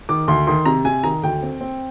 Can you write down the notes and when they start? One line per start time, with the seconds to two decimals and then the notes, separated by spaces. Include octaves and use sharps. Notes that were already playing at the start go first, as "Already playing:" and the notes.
0.09 D#3 D6
0.28 D2 C6
0.47 D#3 C6
0.66 C3 A#5
0.85 C3 G#5
1.04 D#3 A#5
1.23 D2 G5
1.43 C4
1.61 C4